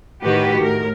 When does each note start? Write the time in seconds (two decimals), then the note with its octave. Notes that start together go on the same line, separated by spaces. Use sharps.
0.21 A2 D#3 F#4 G4 B4
0.60 A2 A#4